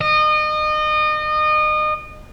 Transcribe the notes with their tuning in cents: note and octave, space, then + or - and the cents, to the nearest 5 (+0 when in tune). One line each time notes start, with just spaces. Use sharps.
D#5 -30